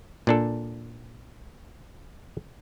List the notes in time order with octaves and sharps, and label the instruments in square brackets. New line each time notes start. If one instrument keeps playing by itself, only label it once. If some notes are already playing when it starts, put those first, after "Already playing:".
[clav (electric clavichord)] A#2 D4 A4